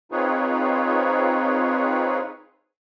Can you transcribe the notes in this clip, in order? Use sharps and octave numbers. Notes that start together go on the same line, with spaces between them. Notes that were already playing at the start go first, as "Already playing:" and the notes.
C4 D#4 F4 G#4 B4 C#5